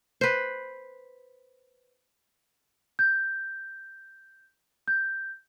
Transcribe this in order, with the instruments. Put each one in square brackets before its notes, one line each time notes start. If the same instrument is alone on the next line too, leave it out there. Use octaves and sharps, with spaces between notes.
[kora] B4 C5
[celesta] G6
G6